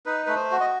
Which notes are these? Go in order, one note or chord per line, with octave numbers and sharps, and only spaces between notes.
D#4 B4
A3 B4
C5
F#4
D#5